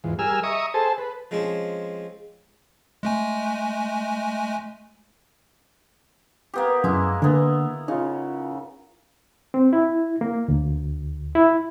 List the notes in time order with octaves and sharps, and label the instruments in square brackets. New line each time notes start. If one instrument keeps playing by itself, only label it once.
[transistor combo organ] E2 G#2 F4
G3 G#4 A#4 G#5 E6 F6
D#5 E5 A#5 C#6 D#6
G#4 A4 C5 A5
B4
[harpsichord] F3 G#3 C4 C#4 G#4
[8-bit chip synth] G#3 A3 G#5
[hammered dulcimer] A#3 B3 G4
[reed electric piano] F#2 [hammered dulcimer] G#3 E4
[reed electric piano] D3 A#3 [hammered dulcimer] B3 A#4
[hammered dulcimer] C#3 [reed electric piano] D#4 F4
[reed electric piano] C4
E4
A#3
D2
E4